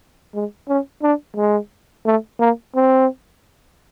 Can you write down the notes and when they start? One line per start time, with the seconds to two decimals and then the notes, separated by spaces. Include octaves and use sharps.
0.34 G#3
0.68 C#4
1.03 D4
1.36 G#3
2.06 A3
2.40 A#3
2.75 C4